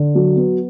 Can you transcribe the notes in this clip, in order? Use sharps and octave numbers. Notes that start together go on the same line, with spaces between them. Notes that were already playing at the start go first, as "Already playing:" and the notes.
Already playing: D3
F#3
B3